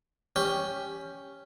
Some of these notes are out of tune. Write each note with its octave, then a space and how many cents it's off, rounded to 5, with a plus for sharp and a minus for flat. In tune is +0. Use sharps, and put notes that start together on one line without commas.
C#4 +0 G4 +10